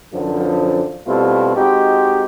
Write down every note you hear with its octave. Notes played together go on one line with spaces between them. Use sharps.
F#2 D3 E3 F3
B2 G3 A3 C4 E4 F4
G#3 C4 D#4 F#4 G4